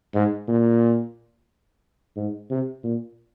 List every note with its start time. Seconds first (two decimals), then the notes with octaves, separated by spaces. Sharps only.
0.14 G#2
0.48 A#2
2.16 G#2
2.50 C3
2.84 A#2